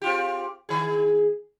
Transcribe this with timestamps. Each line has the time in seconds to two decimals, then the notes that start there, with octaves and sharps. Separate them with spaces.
0.02 C4 F4 G4
0.69 D#3 G#4